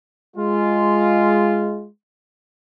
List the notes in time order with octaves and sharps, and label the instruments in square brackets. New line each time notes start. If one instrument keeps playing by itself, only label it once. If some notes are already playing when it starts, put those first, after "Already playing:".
[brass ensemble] G#3 F4